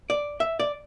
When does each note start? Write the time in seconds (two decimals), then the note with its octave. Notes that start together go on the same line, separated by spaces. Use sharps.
0.10 D5
0.40 E5
0.60 D5